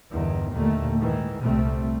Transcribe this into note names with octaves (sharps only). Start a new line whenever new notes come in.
G1 E2 D#3
D#2 A#2 D3 D#3 A3
G#2 D#3 E3
C2 A#2 G3 A3 C4